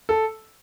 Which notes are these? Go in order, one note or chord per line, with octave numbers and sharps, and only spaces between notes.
A4